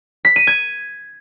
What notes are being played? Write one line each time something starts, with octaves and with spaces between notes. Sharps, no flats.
B6
D#7
G#6